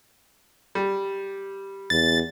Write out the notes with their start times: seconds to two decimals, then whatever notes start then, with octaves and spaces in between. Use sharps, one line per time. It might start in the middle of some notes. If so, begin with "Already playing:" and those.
0.75 G3
1.90 E2 A6